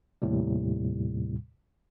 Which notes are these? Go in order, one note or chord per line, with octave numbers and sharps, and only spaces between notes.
D#2 A2 C3 G3